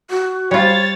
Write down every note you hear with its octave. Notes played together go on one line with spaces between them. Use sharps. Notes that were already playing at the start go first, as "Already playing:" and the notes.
F#4
G3 F4 C5 C#5 A6